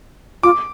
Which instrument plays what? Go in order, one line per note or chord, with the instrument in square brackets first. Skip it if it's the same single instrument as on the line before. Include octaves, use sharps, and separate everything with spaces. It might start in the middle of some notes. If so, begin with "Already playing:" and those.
[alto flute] F4 [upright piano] D6